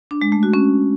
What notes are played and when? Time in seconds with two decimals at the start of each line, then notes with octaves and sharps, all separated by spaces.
0.11 D4
0.22 G#3
0.32 A3
0.43 F#4
0.54 C#4